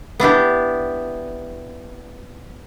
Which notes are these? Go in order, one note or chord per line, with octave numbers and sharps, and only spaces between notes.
B3 D4 E4 G4